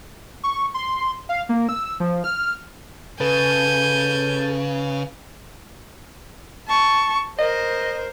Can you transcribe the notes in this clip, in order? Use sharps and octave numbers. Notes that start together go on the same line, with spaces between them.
C#6
C6
F5
A#3
E6
F3
F6
C#3 A4 B4 G#5 A5 G6
A5 C#6
A#4 C5 D#5